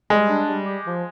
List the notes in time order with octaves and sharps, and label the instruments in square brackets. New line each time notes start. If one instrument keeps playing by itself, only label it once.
[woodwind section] G3 [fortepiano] G#3
[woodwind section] D4
G3
G4
F3